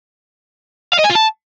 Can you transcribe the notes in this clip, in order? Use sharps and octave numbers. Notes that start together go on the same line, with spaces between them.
F5
D#5
G#5
F4
A5